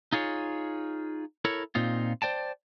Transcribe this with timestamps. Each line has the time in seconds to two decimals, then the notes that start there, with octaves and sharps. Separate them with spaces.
0.13 D#4 F4 G#4 C#5
1.45 E4 A4 A#4 C#5
1.75 A#2 C4 D#4 F4
2.22 C5 D5 G5 A5